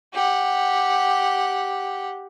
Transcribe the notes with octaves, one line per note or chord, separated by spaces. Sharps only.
G4 F#5